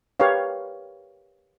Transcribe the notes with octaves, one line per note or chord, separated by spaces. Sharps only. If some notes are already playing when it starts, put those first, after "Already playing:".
G4 A#4 B4 C#5 F5